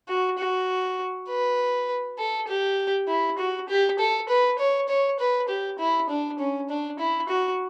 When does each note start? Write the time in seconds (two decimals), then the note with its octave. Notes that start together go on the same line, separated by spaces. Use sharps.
0.08 F#4
0.38 F#4
1.28 B4
2.18 A4
2.48 G4
3.08 E4
3.38 F#4
3.69 G4
3.98 A4
4.29 B4
4.59 C#5
4.88 C#5
5.19 B4
5.49 G4
5.79 E4
6.09 D4
6.39 C#4
6.69 D4
6.99 E4
7.29 F#4